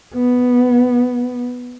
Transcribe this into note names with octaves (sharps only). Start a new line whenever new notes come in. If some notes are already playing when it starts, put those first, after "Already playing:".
B3